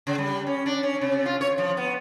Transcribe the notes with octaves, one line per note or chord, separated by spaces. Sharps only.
C#3
G3
C#4
D4
C#4
C3
F4
C#5
F3
B3